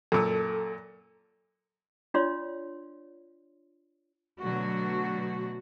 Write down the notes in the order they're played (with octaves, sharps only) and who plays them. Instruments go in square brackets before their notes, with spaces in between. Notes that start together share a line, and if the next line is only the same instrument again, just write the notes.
[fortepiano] F#2 A#2 E6 [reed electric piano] A4
[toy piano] D4 F4 C#5 D5 C6
[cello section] B2 D3 F#3 A3 F#4